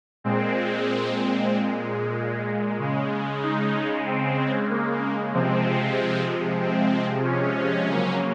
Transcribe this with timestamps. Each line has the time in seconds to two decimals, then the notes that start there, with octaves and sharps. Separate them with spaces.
0.24 A#2 G#3 C4
2.79 C#3 G#3
3.43 D#4
4.06 C4
4.70 A#3
5.33 C3 F3 G#3 C4
6.61 C4
7.25 C#4
7.88 C#3 F#3 A#3